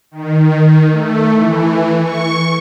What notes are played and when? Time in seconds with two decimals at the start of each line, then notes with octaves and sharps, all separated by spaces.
0.11 D#3
0.91 A3
1.33 E3
2.01 C#6